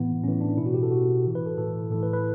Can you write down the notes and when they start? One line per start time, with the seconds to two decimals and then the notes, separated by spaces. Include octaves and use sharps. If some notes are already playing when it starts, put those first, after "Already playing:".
Already playing: A2 E3 B3
0.24 A2 E3 C#4
0.41 D4
0.57 B2 E4
0.66 F#4
0.74 G4
0.83 A4
0.91 B2 F#4
1.25 A2 E3
1.35 B4
1.46 A4
1.58 A2 E3 A4
1.91 A2 E3 A4
2.03 B4
2.13 B4